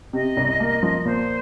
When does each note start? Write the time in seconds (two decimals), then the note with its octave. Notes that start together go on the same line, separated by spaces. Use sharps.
0.13 C3 D#5
0.37 C2
0.60 A#3
0.83 F3
1.05 A#2 C5